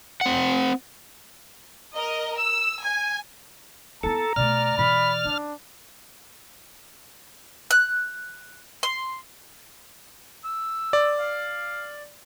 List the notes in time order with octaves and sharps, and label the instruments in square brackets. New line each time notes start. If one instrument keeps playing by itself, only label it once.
[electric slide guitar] C4 F#5
[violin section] A#4 D#5
[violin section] E6 [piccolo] E7
[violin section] G#5 [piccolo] G#6
[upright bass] B3 E4 [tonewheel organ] A4 [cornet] A#5
[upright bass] B2 A3 [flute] D5 [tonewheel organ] F6
[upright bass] B2 E3 [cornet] B5
[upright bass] C#4 [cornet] D4
[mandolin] F#6
C6
[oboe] E6
[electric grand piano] D5
[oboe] F5